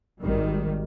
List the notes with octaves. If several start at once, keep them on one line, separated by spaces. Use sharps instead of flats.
G#1 D#3 G3